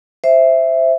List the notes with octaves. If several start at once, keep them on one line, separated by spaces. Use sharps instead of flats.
C5 E5